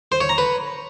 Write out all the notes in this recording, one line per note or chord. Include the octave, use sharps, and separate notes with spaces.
C5
C#5
A#5
B4